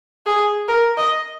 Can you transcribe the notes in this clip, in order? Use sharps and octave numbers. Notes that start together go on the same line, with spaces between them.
G#4
A#4
D#5